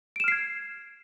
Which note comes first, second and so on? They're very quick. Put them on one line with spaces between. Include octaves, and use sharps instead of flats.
D7 E7 F6 C7 G#6